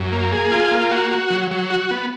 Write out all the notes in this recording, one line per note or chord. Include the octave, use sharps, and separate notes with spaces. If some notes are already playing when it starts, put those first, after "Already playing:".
Already playing: F#2
A#3
G#4
F4
A#3
F#4
F#4
F#3
F#3
F#4
B3